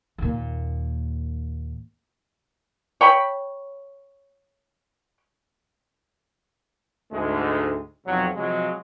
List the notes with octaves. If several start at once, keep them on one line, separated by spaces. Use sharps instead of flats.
D#2 A#2
C#5 G5 B5
D2 G#2 D3 G#3 A3
B1 F2 C3 F#3
C3 F3 F#3 G#3